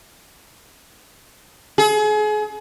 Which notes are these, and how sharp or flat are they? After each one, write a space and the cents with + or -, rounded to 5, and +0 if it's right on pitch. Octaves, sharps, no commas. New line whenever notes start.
G#4 +35